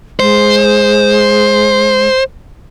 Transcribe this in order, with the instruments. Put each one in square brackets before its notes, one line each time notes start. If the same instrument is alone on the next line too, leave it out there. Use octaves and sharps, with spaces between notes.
[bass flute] G#3 [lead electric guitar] C5